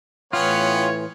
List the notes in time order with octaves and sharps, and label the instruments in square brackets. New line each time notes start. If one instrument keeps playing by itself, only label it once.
[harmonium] A2 E3 [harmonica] B3 C#4 G5 [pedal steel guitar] F4 [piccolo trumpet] C#5